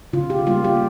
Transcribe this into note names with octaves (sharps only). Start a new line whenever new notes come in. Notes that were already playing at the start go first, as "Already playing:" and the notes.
C#3 F4
G4
G3 A#3 F4
G4